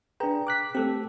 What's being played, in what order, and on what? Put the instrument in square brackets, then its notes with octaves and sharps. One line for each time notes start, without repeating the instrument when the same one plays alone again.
[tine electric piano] D4 G#4 [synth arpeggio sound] B4 G5 A#5
[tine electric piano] D6 F#6 B6
[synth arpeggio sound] A3 C4 [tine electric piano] G4 A4